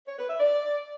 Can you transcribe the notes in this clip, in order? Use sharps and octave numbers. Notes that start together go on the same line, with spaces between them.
C#5
B4
E5
D5